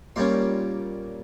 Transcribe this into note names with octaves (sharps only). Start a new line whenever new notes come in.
A#2 G3 C#4 C6